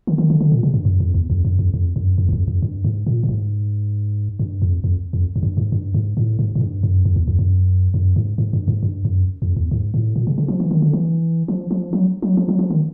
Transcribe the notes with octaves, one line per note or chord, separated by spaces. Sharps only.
D#3
D#3
D3
D3
A#2
C3
G2
F#2
F2
E2
F2
F#2
F2
F2
F#2
F2
E2
F2
F2
G2
G#2
A#2
A2
G#2
G2
F2
F2
F2
F#2
G2
G#2
G2
G#2
A2
G#2
G#2
G2
F#2
F2
E2
F2
F#2
F#2
G#2
G#2
G2
G#2
G2
F#2
F2
E2
G#2
A2
A#2
C3
C#3
F3
E3
D#3
D3
E3
F3
F3
F#3
F#3
F3
F#3
F3
D#3